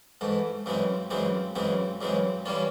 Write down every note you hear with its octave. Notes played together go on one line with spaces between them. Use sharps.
G#2 E3 A3
F#2 C#3 E3 G#3 C4
F#2 C#3 E3 G#3 C4
F#2 C#3 E3 G#3 C4
F#2 C#3 E3 G#3 C4
E3 G3 A#3 C#4 F4